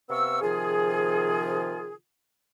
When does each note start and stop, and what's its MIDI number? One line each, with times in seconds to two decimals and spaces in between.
0.09 0.38 48
0.09 0.38 59
0.09 0.38 77
0.09 0.38 85
0.09 0.38 88
0.41 1.94 48
0.41 1.94 51
0.41 1.94 53
0.41 1.94 65
0.41 1.94 68